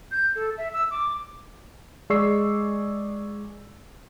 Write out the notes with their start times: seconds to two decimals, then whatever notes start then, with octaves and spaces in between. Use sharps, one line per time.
0.11 G6
0.35 A4
0.58 E5
0.73 E6
0.91 D6
2.10 G#3 G#4 D5 C#6 E6 C7